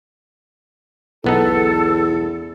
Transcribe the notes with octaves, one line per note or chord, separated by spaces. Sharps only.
B1 E2 B3 D#4 A4